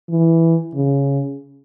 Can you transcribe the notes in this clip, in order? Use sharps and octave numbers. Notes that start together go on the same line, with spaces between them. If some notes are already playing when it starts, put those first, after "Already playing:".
E3
C#3